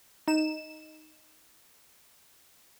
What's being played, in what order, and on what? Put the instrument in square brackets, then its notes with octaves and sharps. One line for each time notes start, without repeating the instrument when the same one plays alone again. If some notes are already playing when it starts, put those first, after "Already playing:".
[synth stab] D#4 E7